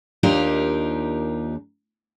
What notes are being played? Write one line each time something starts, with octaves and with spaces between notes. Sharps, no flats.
D#2 D4 D#4 F4 G4 A#4